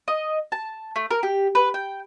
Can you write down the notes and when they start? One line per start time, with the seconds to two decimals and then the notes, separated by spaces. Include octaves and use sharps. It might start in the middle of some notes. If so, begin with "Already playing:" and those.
0.08 D#5
0.52 A5
0.96 A3
1.11 A#4
1.23 G4
1.55 B4
1.74 G5